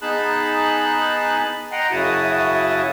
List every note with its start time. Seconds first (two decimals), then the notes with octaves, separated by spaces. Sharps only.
0.02 B3 D#4 G#4 A5 B5 F#6
1.72 D#5 F#5 G5 A#5 C6
1.91 F#2 C#3 E4 F#4 A5 D#6